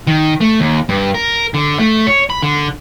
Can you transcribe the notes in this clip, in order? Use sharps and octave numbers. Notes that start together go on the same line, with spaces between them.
D#3
A3
D#2
G2
A#4
D3
A3
C#5
B5
D3